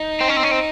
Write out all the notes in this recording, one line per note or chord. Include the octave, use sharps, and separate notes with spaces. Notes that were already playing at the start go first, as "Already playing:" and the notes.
Already playing: D#4
C4
C#4
C4
C#4
C4